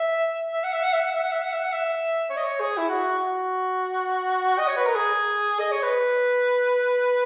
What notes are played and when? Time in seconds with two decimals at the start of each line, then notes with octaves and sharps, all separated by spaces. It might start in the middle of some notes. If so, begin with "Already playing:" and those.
Already playing: E5
0.53 E5
0.64 F#5
0.73 E5
0.83 F#5
0.93 E5
1.03 F#5
1.13 E5
1.22 F#5
1.32 E5
1.42 F#5
1.52 E5
1.62 F#5
1.72 E5
2.30 C#5
2.37 D#5
2.44 C#5
2.60 G#4
2.77 E4
2.89 F#4
3.19 F#4
4.58 D#5
4.68 C#5
4.76 B4
4.86 A#4
4.95 G#4
5.59 D#5
5.72 C#5
5.83 B4